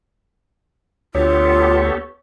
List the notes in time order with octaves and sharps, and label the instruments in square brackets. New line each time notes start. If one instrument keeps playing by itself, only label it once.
[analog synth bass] D2 [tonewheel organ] B3 G4 A4 [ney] F4 [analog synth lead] C#5